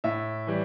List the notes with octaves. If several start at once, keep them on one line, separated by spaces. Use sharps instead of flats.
A2 E5
E3 G3